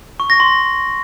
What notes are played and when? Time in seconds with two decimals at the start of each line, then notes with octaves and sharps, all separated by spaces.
0.20 C#6
0.30 A#6
0.40 C6